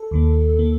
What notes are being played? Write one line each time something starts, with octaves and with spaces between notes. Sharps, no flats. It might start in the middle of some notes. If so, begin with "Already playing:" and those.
Already playing: A4
D#2 D#3 A#3
D#3 A#3